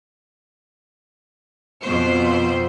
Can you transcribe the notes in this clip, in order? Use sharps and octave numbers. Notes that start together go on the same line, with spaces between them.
F2 B2 C5